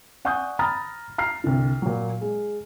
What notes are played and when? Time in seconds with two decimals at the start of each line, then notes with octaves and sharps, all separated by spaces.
0.25 D5 F#5 G#5 C#6 D#6 G6
0.59 A#5 B5 D#6 F6 A6 A#6
1.18 A#5 F6 C7
1.44 C2 D3
1.82 A#2 F#3
2.21 G#3